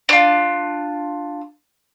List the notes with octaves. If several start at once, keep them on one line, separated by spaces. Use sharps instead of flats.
D4 F4